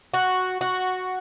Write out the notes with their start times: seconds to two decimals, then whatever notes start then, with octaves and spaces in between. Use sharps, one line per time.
0.14 F#4
0.61 F#4